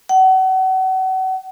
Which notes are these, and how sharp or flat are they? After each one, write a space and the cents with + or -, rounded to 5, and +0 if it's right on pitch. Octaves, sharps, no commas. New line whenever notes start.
F#5 +35